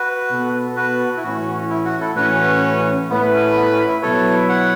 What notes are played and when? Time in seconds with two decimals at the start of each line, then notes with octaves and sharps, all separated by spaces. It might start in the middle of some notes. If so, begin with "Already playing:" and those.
Already playing: F#4 B4
0.30 B2 B3 A4
0.76 F#4 B4
1.17 E4
1.23 A2 E3 C#4 F#4
1.70 E4
1.85 F#4
2.01 E4 A4
2.16 A2 E3 C#4 F#4 B4
3.09 A2 A3 B3 E4 B4
3.33 C#4
3.56 B3
3.72 C#4
3.87 E4
4.02 B2 F#3 B3 E4 A4 B4 C#5
4.49 C#5 F#5